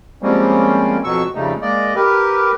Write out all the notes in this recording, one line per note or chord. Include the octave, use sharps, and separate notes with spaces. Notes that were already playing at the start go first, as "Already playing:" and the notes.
F3 G3 G#3 A#3 C4 C#4
F2 B2 F#3 C#6 E6
F2 C#3 G3 A3 D#4
G#3 A#3 D5 D#5
G4 A#4 B4